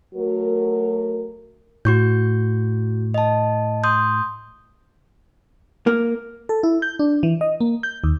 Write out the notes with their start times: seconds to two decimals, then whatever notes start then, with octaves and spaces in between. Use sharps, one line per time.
0.15 F#3 A3 F#4 A#4
1.85 A2 F#4 C#6 G6
3.14 D#5 A5
3.84 C6 D#6 G6
5.87 A#3
6.49 A4
6.63 E4
6.82 G6
6.99 D4
7.23 E3
7.41 D#5
7.60 A#3
7.83 G6
8.04 D#2